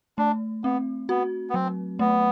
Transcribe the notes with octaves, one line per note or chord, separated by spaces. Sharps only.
A3 D4
B3 C4
B3 F#4
B3
F#3 C4
A3 B3